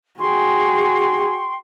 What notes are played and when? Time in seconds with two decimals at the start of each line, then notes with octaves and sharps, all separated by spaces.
0.20 F#4 G#4 G5 C6 C#6